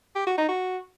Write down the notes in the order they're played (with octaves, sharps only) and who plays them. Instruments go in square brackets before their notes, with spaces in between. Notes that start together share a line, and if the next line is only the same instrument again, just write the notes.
[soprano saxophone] G4
F#4
D#4
F#4